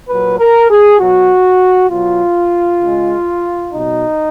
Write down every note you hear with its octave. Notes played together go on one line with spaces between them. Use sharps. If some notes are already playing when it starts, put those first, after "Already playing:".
A#2 F#3 B4
A#4
G#4
B2 F#3 F#4
B2 F#3 F4
C#3 G#3
B2 F#3 D#4